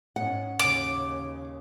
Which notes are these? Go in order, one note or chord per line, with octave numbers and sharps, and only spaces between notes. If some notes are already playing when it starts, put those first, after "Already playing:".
G#2 C#4 F#5
D#2 C#3 D6